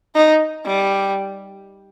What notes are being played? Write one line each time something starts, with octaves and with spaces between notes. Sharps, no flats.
D#4
G3